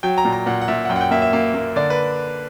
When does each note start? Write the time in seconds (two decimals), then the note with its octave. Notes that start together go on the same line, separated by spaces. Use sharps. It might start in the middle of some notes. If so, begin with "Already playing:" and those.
0.03 F#3 G5
0.18 A#5
0.25 A#2
0.33 A#5
0.46 A#2 F#5
0.62 F#5
0.68 A#2 E5
0.85 F#5
0.89 F#2 G5
0.96 F#5
1.01 G5
1.11 A#3 E5
1.22 E5
1.33 A#3
1.54 A#3
1.76 D3 D5
1.90 B4